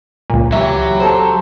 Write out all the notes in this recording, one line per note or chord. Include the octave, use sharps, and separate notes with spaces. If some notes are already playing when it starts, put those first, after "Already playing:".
C#2 A#2
E3 F#3 G4 E5
A4 C5